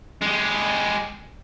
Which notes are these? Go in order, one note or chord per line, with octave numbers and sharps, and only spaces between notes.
G#3 G4